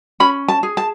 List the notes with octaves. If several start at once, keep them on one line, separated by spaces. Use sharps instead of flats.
C#4 B5
A5
G#4
A5